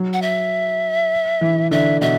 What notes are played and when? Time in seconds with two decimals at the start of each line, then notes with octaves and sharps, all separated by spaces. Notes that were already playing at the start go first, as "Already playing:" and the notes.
Already playing: F#3
0.13 F#5
0.22 E5
1.41 E3
1.71 D3 E5
2.01 B2 E5